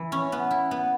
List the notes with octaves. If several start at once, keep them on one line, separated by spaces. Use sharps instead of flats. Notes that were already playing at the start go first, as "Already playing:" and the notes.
Already playing: E3 E4
C#4
B3
E4
B3